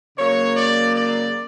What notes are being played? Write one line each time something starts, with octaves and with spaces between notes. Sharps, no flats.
C#3 F#3 A#3 C#5
D5
D5